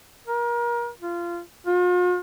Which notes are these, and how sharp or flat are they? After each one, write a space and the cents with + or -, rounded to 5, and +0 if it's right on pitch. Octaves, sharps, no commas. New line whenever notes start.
A#4 +30
F4 -20
F4 +45